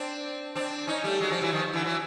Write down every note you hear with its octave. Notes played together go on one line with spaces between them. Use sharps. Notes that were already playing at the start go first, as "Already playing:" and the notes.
Already playing: C4 D4
C4 D4
C#4 D#4
G3 A3
F#3 G#3
F3 G3
E3 F#3
D#3 F3
D3 E3
E3 F#3